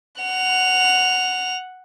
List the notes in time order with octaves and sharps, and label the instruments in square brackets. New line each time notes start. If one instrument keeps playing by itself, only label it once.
[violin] F#5 F7